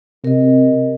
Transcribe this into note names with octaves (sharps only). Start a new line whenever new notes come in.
C3 A#4 D#5